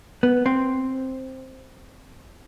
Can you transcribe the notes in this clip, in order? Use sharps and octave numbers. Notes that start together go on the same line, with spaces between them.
B3
C4